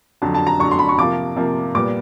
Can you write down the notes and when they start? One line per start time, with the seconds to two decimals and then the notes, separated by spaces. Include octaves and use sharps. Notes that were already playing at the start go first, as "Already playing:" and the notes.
0.22 F2 D3 F#3 A5
0.35 A5
0.47 A#5
0.59 F2 D3 F#3 C#6
0.71 C6
0.79 B5
0.89 C#6
0.98 C3 F3 A#3 D6
1.36 C3 F3 A#3
1.75 A#2 G3 B3 D6